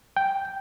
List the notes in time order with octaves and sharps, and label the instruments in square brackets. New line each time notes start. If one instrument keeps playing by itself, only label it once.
[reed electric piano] G5